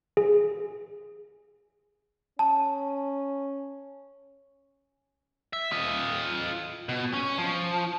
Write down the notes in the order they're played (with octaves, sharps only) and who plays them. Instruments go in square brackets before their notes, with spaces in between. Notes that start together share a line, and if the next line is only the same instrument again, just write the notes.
[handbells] G#4
[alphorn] C#4 [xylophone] A5
[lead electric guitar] E5
F4 D#5
B2
C#4
F3